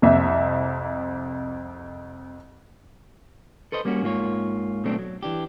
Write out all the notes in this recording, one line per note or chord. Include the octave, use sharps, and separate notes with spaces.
C2 F2 E5
A4 B4 C5 D#5
G3 A#3 C#4 F#4
G#2 A#3 F4 C#5
B2 F#3 A3 C4 D4
F#3
E3 D4 G4